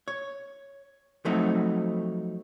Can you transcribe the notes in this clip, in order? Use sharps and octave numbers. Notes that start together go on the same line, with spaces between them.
C#5
F3 F#3 A3 C4 D#4